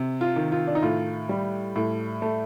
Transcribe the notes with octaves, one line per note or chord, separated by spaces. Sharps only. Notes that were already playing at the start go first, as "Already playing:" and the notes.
Already playing: C3
F4
D#3
F4
D4
D#4
A2 F4
G3
A2
A3